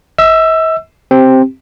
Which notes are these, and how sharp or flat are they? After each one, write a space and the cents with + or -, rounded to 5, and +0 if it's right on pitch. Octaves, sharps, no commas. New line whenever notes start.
E5 -45 E6 +20
C4 +5 G4 -10